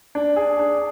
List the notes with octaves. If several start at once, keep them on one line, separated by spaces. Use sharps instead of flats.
D4
G#4
D4